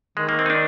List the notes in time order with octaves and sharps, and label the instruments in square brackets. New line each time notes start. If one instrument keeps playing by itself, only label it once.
[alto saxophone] D#3 [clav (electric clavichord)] G#3
[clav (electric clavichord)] A#3
C4
D#4
D4